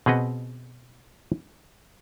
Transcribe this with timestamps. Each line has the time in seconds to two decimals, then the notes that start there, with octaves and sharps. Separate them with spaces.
0.06 B2 C4 G#4 B4 D#5 F#5